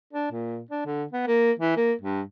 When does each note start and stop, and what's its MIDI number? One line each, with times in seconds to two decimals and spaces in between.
0.13 0.27 62
0.32 0.60 46
0.71 0.82 62
0.86 1.04 50
1.13 1.24 59
1.28 1.52 58
1.60 1.76 52
1.77 1.93 58
2.02 2.22 43